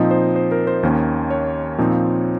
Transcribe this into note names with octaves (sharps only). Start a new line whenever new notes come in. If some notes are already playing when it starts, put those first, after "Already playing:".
Already playing: A#2 F3 C4 D#4 D#5
C5
C5
A#4
C5
D#2 D#3 A#3 C#4
C#5
A#2 F3 C4 D#4